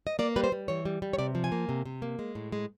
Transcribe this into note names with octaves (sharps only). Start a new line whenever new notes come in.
D#5
A#3 D5
G3 B4
C5
G3
E3 C#5
G3
G3
C#5
C3 D5
F3
G#5
A#3
C3
C3
A#3
G#3
A2
G#3